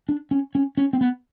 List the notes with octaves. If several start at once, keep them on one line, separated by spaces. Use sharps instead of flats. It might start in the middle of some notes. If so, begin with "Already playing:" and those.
D4
C#4
C#4
C#4
C4
B3